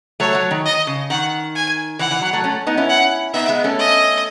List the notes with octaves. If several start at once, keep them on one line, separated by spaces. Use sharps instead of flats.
F#3 A3 C#5
F#3
D#3
D#5
C#3
D#3 F#5
G#5
E3 F#5
E3
F#3
F#3 A3
A3 C#4
B3 D#4
C#4 E4
F#5
B3 D#4 E5
G#3 B3
A3 C#4
D#5